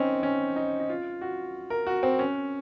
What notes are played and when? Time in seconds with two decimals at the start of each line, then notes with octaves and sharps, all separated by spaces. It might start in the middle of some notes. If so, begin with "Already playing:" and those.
Already playing: C4 C#4 D#4
0.23 C#4
0.56 D#4
0.80 D#4
0.89 F4
1.21 F#4
1.70 A#4
1.87 F#4
2.03 C4
2.19 C#4